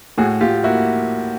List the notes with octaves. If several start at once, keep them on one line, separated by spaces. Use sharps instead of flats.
A2 F#4 G#4
A2 F4 G4
A#3 E4 F#4